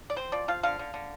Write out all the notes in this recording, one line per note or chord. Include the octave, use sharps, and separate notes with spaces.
D5
C4 C5
F3 D5
F3 F5
D3 F5
D3
D3